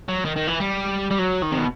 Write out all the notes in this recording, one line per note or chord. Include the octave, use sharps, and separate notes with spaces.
F#3
D#3
D#3
E3
G3
G3
F#3
D#3
C3
B2